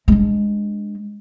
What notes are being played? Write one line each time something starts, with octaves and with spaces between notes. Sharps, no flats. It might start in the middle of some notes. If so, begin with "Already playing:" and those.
G#3 D4